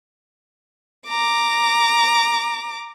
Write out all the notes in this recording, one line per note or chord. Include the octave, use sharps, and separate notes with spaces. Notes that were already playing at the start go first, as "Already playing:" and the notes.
A#5 D6